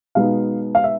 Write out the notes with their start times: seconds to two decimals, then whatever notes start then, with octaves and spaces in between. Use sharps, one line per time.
0.15 B2 G#3 B3 D#4 F5
0.75 F5
0.84 E5